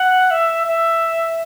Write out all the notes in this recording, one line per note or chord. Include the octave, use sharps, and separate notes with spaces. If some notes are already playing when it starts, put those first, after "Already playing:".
Already playing: F#5
E5
E5